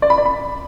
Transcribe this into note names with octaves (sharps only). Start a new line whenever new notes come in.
D5
B5
D5
B5